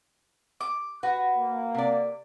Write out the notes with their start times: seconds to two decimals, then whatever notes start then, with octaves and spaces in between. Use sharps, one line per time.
0.61 D6
1.03 F#4 B4
1.37 A#3
1.75 C3 D5